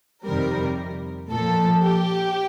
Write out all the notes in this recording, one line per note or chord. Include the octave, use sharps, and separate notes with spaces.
F2 C3 D#3 G3 A#4
A#2 F3 A4
G4